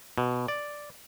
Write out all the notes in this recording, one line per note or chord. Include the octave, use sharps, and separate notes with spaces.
B2
D5